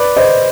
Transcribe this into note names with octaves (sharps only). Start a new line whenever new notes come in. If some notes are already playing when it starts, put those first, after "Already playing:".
Already playing: B4 D5
C5 D#5